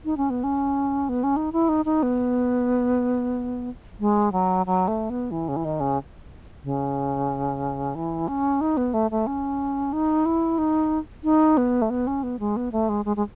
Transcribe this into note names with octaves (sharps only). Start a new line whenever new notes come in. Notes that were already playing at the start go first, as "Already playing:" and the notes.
D#4
C#4
B3
C#4
B3
C#4
D#4
E4
D#4
D#4
B3
G#3
F#3
F#3
A3
B3
E3
C#3
E3
D#3
C#3
C#3
E3
C#4
D#4
B3
A3
A3
C#4
D#4
E4
D#4
D#4
B3
A3
B3
C#4
B3
G#3
B3
A3
G#3
G#3
G#3